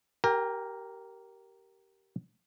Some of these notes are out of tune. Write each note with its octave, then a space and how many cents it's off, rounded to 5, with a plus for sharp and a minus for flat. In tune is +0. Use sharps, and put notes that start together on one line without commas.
G4 -20 A#4 +0 G5 +35